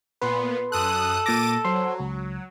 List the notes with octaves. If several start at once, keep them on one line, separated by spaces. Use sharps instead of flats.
A#2 B3 B4 C6
F#2 A4 D#6 F#6
A#2 D6 A6 A#6 D#7
F#3 C5 C6
C#2